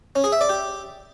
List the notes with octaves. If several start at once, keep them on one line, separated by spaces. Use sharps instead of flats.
C#4
G#4
E5
D5
G4